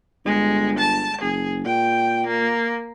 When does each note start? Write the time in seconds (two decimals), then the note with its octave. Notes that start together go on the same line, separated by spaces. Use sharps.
0.25 G1 G#3
0.79 A5
1.22 F#1 G#4
1.66 A#2 G5
2.27 A#3